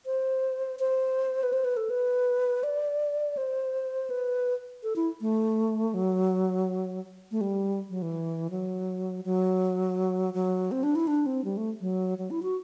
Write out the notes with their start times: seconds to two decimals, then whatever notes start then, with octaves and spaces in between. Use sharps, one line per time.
0.06 C5
0.80 C5
1.43 B4
1.53 C5
1.65 B4
1.77 A4
1.90 B4
2.63 D5
3.37 C5
4.10 B4
4.83 A4
4.96 E4
5.21 A3
5.94 F#3
7.31 A3
7.41 G3
7.90 F#3
8.02 E3
8.50 F#3
9.25 F#3
10.34 F#3
10.71 C4
10.83 D4
10.95 E4
11.07 D4
11.26 C4
11.44 G3
11.57 A3
11.81 F#3
12.18 F#3
12.30 E4
12.43 F#4